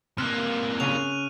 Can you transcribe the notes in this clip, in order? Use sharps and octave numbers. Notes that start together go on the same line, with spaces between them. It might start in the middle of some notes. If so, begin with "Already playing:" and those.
C3 A#3 F6 F#6
C#3 D#7 F7